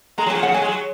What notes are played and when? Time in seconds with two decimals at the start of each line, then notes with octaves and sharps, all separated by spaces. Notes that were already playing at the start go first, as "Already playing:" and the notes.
0.18 G#3 A#5
0.26 F#3
0.30 G#5
0.35 F3
0.43 C#3 F#5
0.52 F#3
0.54 G#5
0.62 G#3
0.69 F#3